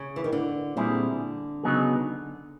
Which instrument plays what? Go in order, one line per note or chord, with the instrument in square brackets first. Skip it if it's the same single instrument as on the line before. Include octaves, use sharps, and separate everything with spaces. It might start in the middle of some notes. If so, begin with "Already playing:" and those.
Already playing: [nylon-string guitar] C#3
E3
D#3
D3
[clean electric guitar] A#2 G3 C4 E4 G#4 [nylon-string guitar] D3
[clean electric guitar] C#3 F#3 B3 D#4 G#4